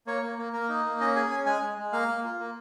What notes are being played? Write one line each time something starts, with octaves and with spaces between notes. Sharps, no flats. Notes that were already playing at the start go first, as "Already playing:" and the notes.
A#3 C#5
A#3
A#3
A#3 A#4
D#4
A#3
C#4 D#5
G#4 G#5
C#4 G#5
G#3 G#5
G#3
G#3
A#3 F5
A#3
F4
A#3